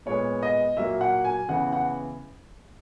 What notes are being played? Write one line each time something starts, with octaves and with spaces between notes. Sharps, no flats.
A#2 G#3 B3 C#5
D#5
A#2 F#3 A#3 E5
F#5
G#5
C#3 E3 B3 F#5
F#5